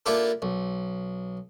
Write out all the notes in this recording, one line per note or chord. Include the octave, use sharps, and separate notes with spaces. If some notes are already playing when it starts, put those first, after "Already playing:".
A#3 D4 E4 F4 G4 A4
B1